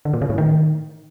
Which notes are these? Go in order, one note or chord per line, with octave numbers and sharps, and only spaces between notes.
D3
A#2
C#3
A2
D#3